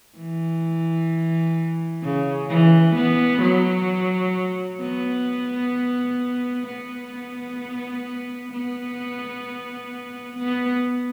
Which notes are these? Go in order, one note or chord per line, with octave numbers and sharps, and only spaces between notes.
E3
C#3
E3
B3
F#3
B3
B3
B3
B3